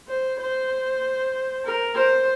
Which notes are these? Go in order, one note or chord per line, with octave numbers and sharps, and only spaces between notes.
C5
C5
A#4
C5